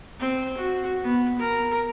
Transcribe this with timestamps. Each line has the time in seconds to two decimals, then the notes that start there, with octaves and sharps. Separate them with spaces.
0.20 C4
0.57 F#4
1.04 B3
1.39 A#4